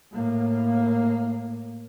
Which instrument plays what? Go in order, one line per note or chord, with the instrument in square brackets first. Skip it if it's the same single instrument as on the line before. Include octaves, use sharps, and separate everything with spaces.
[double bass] A2 A#3